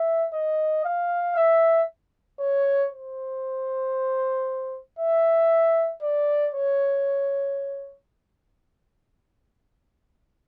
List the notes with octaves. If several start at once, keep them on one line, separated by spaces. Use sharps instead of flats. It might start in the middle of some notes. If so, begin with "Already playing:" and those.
Already playing: E5
D#5
F5
E5
C#5
C5
E5
D5
C#5